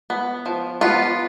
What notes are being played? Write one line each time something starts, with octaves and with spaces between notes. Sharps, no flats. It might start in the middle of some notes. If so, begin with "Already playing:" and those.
B3
F3
B3 F4